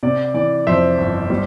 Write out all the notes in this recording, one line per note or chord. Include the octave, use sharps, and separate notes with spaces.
C3 D5
E3 D5
F2 C5 E5
G1
G3